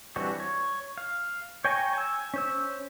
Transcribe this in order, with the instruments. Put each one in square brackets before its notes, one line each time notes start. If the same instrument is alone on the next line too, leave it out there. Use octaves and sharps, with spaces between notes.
[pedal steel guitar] E3 G3 C4 D4 F#4
C#5
F5
C#5 G5 G#5 A#5 C#6
G#5 E6
C#4 C5 E6